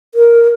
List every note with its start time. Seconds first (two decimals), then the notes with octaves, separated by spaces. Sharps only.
0.15 A#4